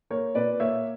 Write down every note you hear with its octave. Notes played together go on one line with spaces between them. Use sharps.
A#3 A#4 C#5
A#2 B4 D5
A#3 C#5 E5